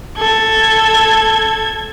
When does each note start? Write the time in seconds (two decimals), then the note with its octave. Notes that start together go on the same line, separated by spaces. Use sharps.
0.18 A4 G#6